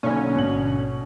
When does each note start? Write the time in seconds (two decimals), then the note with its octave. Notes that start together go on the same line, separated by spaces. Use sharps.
0.03 B1 D3 A#3 C#4 C#5
0.36 A1 G#2 B2 F#7